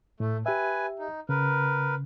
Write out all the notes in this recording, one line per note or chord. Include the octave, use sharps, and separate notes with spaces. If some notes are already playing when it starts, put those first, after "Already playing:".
A2 A3
G4 B4 E5 G#5
D#4
C#3 A#4 B4